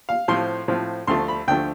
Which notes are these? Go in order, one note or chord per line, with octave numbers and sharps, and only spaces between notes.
F5
A2 F3 C4 F4 C6
A2 F3 C4 F4
D2 D3 F3 A3 C6
B5
D2 D3 F3 A3 G5